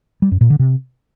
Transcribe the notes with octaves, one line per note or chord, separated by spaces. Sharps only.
G3
F#2
A#2
D3
C3